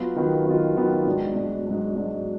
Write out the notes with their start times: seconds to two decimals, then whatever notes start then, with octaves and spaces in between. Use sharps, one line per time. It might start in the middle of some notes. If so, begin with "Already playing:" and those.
Already playing: F#3 B3 F4
0.16 D#3 F#3 B3 F4
0.46 D#3 F#3 B3 F4
0.77 D#3 F#3 B3 F4
1.06 G#2 F#3 D4
1.36 G#2 F#3 D4
1.66 G#2 F#3 D4
1.96 G#2 F#3 D4